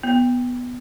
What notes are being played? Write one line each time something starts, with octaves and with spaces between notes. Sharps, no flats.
B3